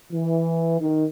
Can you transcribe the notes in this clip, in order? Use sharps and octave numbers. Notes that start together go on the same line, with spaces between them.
E3
D#3